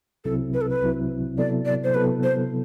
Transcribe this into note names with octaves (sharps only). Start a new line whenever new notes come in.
C2 C3 F#3 C4 E4 A4
B4
A4
B4
C2 C3 F#3 C4 E4
C3 F#3 B3 E4 A4 D5
D5
C5
C3 F#3 B3 E4 A4 B4
C5